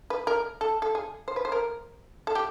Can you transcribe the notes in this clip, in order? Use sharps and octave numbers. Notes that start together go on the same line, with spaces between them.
B4
A#4
A4
A4
G#4
C5
B4
C5
A#4
A4
G4